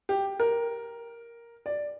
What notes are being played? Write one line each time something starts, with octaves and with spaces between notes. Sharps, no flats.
G4
A#4
D5